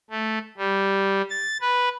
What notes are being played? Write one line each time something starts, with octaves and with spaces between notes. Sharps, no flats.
A3
G3
A6
B4